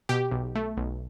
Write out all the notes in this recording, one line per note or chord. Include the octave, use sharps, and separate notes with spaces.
B2 G4
B1
A3
B1